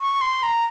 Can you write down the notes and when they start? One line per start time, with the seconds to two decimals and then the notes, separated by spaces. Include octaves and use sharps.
0.01 C#6
0.21 C6
0.43 A#5